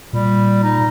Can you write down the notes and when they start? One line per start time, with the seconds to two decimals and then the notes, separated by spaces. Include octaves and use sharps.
0.13 A#2 G3
0.63 D#4